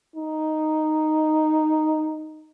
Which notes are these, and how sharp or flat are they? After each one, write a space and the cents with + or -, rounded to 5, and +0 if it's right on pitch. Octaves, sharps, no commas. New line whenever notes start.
D#4 -5